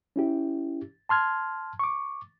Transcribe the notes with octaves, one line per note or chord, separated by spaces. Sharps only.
C#4 E4 G4
A5 C6 F6 G#6
C#6 D6